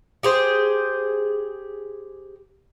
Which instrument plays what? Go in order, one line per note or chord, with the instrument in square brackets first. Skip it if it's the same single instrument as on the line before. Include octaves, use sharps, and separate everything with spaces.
[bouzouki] G4 G#4 C5